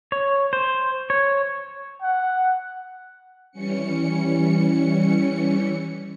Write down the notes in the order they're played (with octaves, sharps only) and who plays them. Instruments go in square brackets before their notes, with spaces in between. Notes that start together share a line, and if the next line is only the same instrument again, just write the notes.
[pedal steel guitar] C#5
C5
C#5
[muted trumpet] F#5
[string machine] E3 G3 C#4 C#7